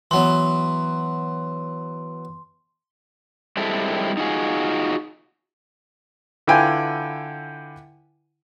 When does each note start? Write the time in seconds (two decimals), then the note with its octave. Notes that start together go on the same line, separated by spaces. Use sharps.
0.11 E3 F#3 B3 C6
3.57 G3 G#3 C4 E4 A4
4.17 D#4 F4 F#4 G#4
6.47 D3 E4 F4 B4 G5 G#5